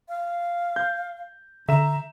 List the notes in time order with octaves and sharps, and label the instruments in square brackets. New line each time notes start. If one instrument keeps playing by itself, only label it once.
[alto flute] F5
[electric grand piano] G6
[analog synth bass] D3 [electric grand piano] E5 E7 [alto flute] A#5